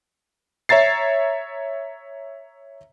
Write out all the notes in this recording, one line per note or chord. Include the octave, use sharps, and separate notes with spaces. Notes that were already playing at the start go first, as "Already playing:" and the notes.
C#5 E5 A#5 A6 C7